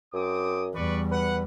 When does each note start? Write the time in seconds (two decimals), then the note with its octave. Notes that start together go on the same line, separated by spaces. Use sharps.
0.14 F#2 C4 D6 D#6
0.75 E2 G3 B4 D5 C#6
1.11 B4 F#5